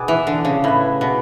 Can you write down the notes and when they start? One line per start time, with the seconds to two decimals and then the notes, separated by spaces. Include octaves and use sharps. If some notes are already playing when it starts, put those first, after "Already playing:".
Already playing: B2 B3 D4 G#4 D5
0.08 E3
0.27 D3
0.45 C#3
0.64 A2 E4 B4 E5
1.01 B2